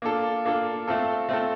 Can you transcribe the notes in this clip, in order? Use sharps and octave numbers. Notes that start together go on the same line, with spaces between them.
A#3 D4 F4 A4
A#3 D4 F4 A4
A3 C4 F4 A4
A3 C4 F4 A4